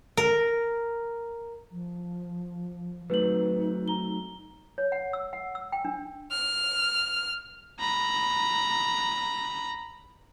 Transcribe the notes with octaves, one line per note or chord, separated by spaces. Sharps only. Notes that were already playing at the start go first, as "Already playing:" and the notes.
A#4
F3
F#3 A3 C4 D#4 B4 F#7
A#5 G7
C#5
F#5
E6
F#5
E6
G5
D4
F6
A#5 B5